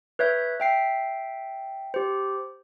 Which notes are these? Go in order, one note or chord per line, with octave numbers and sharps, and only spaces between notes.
B4 C#5 E5 G6
E5 G5 C7
G4 C5